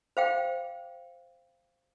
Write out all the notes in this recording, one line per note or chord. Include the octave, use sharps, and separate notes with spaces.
C5 F5 G5